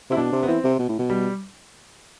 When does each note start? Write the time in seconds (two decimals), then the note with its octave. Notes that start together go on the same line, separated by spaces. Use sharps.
0.10 C3 E4
0.17 B2 D4
0.33 C3
0.43 B3
0.48 E3 C4
0.64 C3
0.79 B2
0.89 A2
0.99 B2
1.10 G3